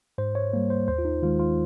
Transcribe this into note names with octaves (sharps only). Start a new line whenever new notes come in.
G#2 C5
C#5
G3 A#3
C5
D#2 C5
F4
D#4
D#3 G#3 F4
F4